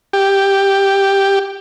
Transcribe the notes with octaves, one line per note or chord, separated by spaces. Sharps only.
G4